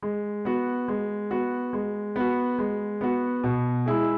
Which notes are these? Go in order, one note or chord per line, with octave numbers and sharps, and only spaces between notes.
G#3
B3 F#4
G#3
B3 F#4
G#3
B3 F#4
G#3
B3 F#4
B2
G#3 E4 G#4